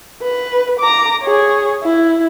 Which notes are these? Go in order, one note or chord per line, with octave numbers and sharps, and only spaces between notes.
B4
A#5 D6
G#4 C#5
E4